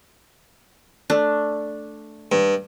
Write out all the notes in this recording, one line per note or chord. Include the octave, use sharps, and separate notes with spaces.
A3 D4
G2